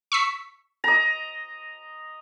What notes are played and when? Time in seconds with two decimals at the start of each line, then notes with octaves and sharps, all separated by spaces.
0.12 C#6 E6 B6
0.84 D#5 A#5